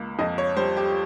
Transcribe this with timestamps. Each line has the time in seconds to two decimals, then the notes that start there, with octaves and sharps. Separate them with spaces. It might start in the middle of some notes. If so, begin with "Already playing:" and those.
Already playing: C#2 A#3
0.19 F2 D#5
0.38 C#5
0.57 G3 C5
0.77 G4